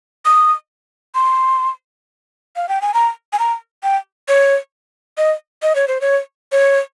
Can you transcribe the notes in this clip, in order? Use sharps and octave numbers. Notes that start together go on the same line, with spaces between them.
D#6
C6
F5
G5
G#5
A#5
G#5
A#5
G5
C#5
D#5
D#5
C#5
C5
C#5
C#5